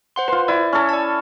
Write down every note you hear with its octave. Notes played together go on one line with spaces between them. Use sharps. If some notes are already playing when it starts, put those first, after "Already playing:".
C5 F#5 C6
F4 B4 C5 C6
E4 D5
C#4 A4
D5 A5